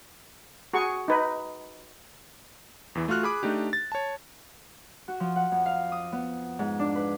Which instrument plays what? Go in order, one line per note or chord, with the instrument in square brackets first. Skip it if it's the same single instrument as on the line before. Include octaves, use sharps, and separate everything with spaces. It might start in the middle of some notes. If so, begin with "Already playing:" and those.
[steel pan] F#4 G#4 C#6
D#4 B4
[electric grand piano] E2 E3
A3 F4 F#4 F6 F#6
G#4 B5 D6
A3 D4 D#4 G4
A6
C#5 A5
[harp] F#4
F3
F#5
F2
F5
D#6
B3
G#2
D4
B4